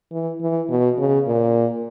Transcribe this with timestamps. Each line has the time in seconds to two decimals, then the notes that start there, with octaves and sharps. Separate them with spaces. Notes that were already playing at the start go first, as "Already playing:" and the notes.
0.12 E3
0.41 E3
0.69 B2
0.98 C#3
1.26 A#2